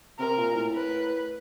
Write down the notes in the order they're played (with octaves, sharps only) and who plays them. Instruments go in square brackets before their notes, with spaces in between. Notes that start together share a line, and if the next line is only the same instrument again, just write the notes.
[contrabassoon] C3 [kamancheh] A#4
[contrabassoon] A#2
A2
[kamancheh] B4